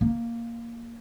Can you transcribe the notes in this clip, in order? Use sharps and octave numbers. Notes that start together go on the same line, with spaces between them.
A#3